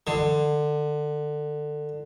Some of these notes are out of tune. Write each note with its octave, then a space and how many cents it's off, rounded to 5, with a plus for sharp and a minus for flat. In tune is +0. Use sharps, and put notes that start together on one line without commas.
D3 +20